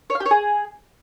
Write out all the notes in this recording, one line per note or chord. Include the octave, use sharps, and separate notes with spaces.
C#5
F5
G4
C#5
G#4